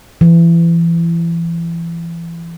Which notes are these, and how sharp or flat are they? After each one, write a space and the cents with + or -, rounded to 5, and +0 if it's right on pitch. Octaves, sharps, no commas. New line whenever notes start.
E3 +30